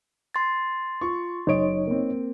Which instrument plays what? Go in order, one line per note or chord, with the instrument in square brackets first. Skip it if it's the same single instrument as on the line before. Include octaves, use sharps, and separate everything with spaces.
[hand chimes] C6 A6
[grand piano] F4 C#6
[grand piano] F#1 D7 [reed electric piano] D#4 C#5 D#5
[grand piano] A#3 C4